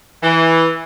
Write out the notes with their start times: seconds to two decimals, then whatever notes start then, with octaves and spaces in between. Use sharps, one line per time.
0.23 E3